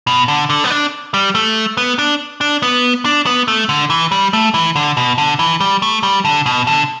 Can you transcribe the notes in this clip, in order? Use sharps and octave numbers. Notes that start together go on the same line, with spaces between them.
B2
D3
D3
B3
D4
G3
A3
B3
D4
D4
B3
D4
B3
A3
D3
E3
G3
A3
E3
D3
B2
D3
E3
G3
A3
G3
D3
B2
D3